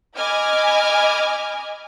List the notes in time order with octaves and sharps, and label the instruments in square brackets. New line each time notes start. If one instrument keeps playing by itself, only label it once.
[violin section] D#5 G#5 B5 D6 F6 G#6